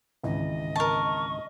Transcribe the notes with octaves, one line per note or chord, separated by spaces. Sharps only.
G#1 C#2 E3 D#5
A#4 A5 C#6